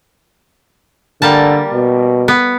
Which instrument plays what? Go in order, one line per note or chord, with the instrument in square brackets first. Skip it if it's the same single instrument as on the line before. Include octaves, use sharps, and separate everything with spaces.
[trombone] D3 [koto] G3 A#3 A5
[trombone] B2
[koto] B3